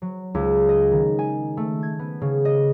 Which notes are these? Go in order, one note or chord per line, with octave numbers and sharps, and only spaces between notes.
F#3
C#2
D#5
D#3
G#5
A3
G#6
B3
C#3
D#5